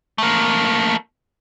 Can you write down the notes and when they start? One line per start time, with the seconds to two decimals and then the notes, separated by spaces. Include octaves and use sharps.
0.18 A3 A#3